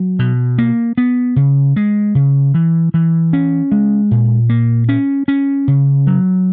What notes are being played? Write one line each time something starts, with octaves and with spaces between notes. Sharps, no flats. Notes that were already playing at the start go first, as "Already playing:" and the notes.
Already playing: F#3
B2
A#3
B3
C#3
G#3
C#3
E3
E3
C#4
G#3
A#2
A#3
C#4
C#4
C#3
F#3